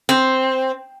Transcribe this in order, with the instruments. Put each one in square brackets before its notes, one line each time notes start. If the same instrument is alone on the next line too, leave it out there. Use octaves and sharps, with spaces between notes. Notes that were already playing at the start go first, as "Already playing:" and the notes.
[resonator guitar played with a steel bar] C4